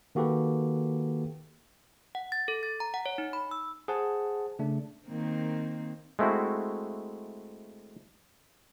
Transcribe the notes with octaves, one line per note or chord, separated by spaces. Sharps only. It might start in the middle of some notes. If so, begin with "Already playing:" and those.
D#3 A#3 F#4 G4 A4 B4
F#5
A6
A4
A6
A#5
F#5
C#5
D#4
B5
E6
G#4 C5 F#5 A5
C#3 A3 D4
D#3 A#3 C4
G#3 A3 C4 E4 F#4